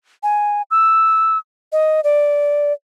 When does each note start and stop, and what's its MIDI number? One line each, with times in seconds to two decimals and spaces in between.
0.23 0.62 80
0.71 1.38 88
1.72 2.01 75
2.04 2.73 74